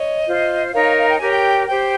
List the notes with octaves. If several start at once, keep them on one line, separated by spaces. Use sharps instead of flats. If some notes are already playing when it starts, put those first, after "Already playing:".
Already playing: C#5 D#5
F4 C5
D#4 A#4 C#5 F5
F5
F5
G5
G4 A#4 C#5 G#5
G5
G4 C5 G5